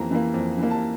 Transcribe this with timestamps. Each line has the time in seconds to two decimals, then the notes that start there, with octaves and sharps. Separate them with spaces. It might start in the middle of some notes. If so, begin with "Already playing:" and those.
Already playing: F2 E3 A#3 A#5
0.11 E3 A#3
0.34 F2
0.58 E3 A#3
0.71 A5